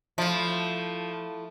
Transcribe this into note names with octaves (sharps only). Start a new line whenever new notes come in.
F3 A3 E4